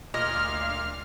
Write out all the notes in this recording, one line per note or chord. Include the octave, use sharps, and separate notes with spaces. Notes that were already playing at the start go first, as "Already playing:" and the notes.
D2 A#2 D#5 F5 F6